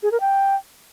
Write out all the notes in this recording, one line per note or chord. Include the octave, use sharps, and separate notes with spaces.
G#4
A#4
G5